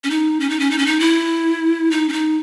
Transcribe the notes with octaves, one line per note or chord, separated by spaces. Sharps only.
C#4
D#4
C#4
D#4
C#4
D#4
C#4
D#4
E4
D#4
C#4
D#4